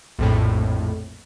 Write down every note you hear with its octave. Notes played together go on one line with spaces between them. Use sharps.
A#1 F2 A2